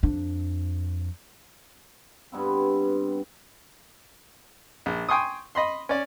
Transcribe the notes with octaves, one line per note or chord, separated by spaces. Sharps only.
F2 D4
G2 B3 C4
A#1
G5 G#5 C6 C#6 D#6
D#5 B5 C6
C#4 D5